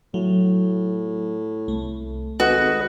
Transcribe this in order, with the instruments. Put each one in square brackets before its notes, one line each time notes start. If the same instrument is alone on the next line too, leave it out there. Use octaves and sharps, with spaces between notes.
[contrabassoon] A2 [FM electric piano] F#3
[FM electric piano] C2 A3
[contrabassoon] G#1 [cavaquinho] F#4 [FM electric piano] A4 [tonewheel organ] B4 D#5